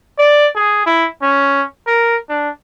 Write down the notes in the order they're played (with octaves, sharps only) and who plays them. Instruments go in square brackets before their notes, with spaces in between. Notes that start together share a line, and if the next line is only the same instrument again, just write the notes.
[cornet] D5
G#4
E4
C#4
A#4
D4